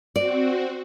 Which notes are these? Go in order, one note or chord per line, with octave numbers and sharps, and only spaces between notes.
C4 F#4 D5